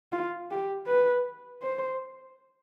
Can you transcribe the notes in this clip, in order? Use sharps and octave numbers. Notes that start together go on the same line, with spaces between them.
F4
G4
B4
C5